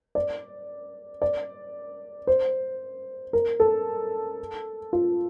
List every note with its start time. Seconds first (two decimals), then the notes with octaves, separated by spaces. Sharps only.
0.15 D5
1.22 D5
2.27 C5
3.33 A#4
3.60 A4
4.93 F4